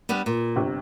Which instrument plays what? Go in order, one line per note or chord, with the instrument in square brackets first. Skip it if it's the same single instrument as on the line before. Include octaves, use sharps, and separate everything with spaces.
[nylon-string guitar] G3 B3 D4
A#2
[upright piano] G1 C3